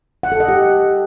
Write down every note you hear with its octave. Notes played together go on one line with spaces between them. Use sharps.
F#5
A4
D#5
G4